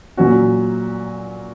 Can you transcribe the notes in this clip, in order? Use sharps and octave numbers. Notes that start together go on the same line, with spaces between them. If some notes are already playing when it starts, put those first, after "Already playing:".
A#2 F#3 C#4 F#4